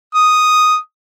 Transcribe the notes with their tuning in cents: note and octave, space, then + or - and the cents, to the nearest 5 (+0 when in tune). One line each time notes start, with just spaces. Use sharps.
D#6 +0